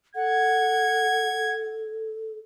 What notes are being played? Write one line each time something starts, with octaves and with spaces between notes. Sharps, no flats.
A4 F#5 G#6